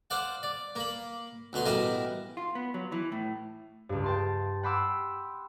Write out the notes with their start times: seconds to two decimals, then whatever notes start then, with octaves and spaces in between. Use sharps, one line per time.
0.10 C5 D5 F5 F#5
0.43 D5
0.75 A#3 B5
1.53 D2 B2 C#5 C6
1.66 A1 B2 G3 A#4 E5 G#5
2.37 F4
2.55 B3
2.74 F#3
2.92 E3
3.12 A2
3.89 C#2 G2
4.04 G5 A5 C6
4.63 F#5 G5 B5 C6 D6 E6